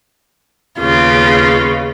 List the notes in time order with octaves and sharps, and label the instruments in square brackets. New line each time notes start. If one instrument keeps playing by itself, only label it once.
[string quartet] D#2 C#3 B3 [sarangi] F4